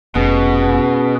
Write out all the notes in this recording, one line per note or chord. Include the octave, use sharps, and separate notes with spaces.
F1 B2 C#4 G#4 B4